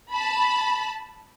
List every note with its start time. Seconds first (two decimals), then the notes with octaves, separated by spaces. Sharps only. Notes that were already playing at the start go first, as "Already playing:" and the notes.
0.13 A5 B5